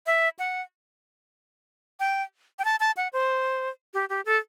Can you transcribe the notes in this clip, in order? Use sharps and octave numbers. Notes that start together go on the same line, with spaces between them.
E5
F#5
G5
G5
A5
A5
F#5
C5
G4
G4
A4